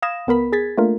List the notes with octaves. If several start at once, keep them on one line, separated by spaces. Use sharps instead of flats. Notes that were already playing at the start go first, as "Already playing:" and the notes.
F5 B5 D#6 G#6 A#6 E7
C#2 B3 A#4 B5 B6
G#4 G#6 A6 B6
A3 A#3 D4 F4 A#4